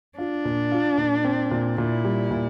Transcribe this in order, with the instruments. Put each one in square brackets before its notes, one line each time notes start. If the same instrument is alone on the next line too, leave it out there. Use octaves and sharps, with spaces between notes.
[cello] D4 [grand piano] F4
[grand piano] A#2
F4
A#2
C4
A#2
[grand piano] A#2 [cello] E4
[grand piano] G3
A#2